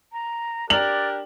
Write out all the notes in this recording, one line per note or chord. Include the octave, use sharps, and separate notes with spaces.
A#5
D4 G4 A#4 D5 F#6 F#7